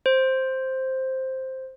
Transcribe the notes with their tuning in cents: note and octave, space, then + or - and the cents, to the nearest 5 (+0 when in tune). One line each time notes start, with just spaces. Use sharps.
C5 +5